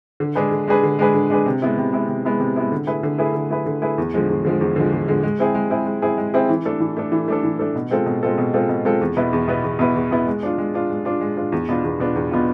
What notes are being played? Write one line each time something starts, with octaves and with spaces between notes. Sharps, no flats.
D3
G#3 D4 G#4 B4
D3
G#3 D4 G#4 B4
D3
G#3 D4 G#4 B4
D3
G#3 D4 G#4 B4
C3
G#3 B3 E4
C3
G#3 B3 E4
C3
G#3 B3 E4
C3
G#3 B3 E4
D3
A3 E4 G#4 B4
D3
A3 E4 G#4 B4
D3
A3 E4 G#4 B4
D3
A3 E4 G#4 B4
E2
D3 F3 G#3
E2
D3 F3 G#3
E2
D3 F3 G#3
E2
D3 F3 G#3
G#3
C4 E4 G#4
G#3
C4 E4 G#4
G#3
C4 E4 G#4
G#3
C4 E4 G#4
E3
A3 D4 A4
E3
A3 D4 A4
E3
A3 D4 A4
E3
A3 D4 A4
B2
G#3 C4 F4 A4
B2
G#3 C4 F4 A4
B2
G#3 C4 F4 A4
B2
G#3 C4 F4 A4
E2
B2 B3 E4 B4
E2
B2 B3 E4 B4
E2
B2 B3 E4 B4
E2
B2 B3 E4 B4
G#3
D4 F4
G#3
D4 F4
G#3
D4 F4
G#3
D4 F4
E2
B2 B3 D4 F4
E2
B2 B3 D4 F4
E2
B2 B3 D4 F4